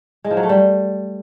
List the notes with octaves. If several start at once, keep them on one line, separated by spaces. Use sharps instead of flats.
G#3
F3
F#3
A3
G3